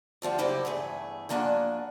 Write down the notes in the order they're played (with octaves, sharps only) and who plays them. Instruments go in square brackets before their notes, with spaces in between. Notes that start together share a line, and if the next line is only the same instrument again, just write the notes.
[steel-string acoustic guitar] D2 F3 G3 F#5
F#2 C#3 A#3 E4 G4 C5
E2 G2 A3 G#4
G2 F3 A#3 D4 F#5 G#5